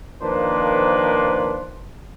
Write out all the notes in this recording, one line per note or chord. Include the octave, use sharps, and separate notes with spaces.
D#3 F3 A#3 D4 B4 C5